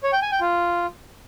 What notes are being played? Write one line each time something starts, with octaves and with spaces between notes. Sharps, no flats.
C#5
G5
G#5
G5
F4